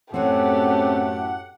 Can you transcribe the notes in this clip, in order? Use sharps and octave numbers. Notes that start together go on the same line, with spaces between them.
F#2 A2 A3 C4 C#4 G4 F#5